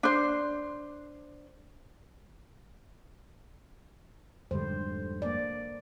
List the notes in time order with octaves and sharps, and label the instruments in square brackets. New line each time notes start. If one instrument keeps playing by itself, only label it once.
[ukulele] D4 C5
[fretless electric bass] F2 G#2 G3 [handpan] D3 C5
[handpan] A#3 D5